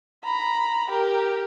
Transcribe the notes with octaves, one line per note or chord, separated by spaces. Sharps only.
A#5 B5
G4 A#4